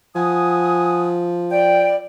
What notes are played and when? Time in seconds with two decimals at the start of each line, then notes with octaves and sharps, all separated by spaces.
0.15 F3 F#5 G#5 D#6
1.51 D5 G5